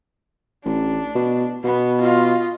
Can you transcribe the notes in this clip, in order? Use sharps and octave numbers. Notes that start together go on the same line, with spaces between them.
A1 D4
B2
B2 B3
F4 D#5